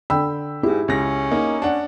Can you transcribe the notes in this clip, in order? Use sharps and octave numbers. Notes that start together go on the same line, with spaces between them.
D3 G5 B5 E6
G#2 E4 G4 G#4
C#2 C#4 A#6
A#3 D#4
D4 F#5